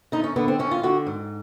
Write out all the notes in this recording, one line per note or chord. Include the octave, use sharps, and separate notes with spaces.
D3 D#4
C#4
D3 B3
C4
D3 C#4
F4
D3 F#4
G#2